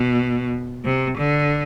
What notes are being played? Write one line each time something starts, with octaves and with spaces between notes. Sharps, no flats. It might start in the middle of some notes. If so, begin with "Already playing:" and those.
Already playing: B2
C3
D3